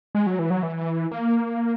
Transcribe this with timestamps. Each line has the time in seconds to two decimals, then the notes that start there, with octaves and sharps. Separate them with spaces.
0.15 G#3
0.27 F#3
0.39 E3
0.50 F#3
0.63 E3
1.11 A#3